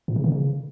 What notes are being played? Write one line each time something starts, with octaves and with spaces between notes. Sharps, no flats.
A#2
C#3
D#3
C#3